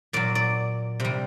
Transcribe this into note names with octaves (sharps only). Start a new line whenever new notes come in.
A#2 F#3 D5
D5
C3 G3